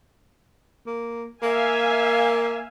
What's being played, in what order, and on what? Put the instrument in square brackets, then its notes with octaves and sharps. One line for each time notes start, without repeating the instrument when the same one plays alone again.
[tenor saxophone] A#3
[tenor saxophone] A#3 [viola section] E5 F5 G#5